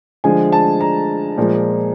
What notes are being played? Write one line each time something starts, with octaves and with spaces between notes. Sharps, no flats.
D3 F3 G#3 G#5
A5
A#5
A#2 F3 G#3